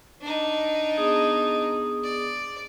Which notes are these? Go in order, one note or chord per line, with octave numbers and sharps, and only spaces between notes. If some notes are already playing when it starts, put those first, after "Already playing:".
D4 D#4
B3 G#4 D#6
D5